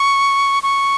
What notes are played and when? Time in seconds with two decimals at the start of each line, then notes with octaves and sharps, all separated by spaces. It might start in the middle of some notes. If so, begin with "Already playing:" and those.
Already playing: C#6
0.63 C#6